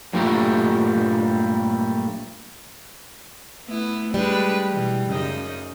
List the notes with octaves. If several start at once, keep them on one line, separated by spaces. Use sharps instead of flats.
G2 A#2 F#3 G3 A3 A#3
A3 B3 E4
G3 G#3 D4 B4
B2 E3
F#2 C#3 D#4